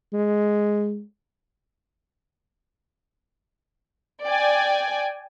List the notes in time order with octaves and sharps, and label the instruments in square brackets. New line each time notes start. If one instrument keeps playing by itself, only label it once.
[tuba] G#3
[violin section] D5 G5 G#5